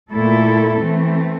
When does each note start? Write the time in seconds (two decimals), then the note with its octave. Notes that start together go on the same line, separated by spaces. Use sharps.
0.12 A#2 A3 E4 A4
0.80 E3 A3 C4